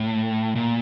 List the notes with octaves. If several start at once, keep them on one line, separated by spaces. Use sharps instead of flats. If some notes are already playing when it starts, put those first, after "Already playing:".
Already playing: A2
A#2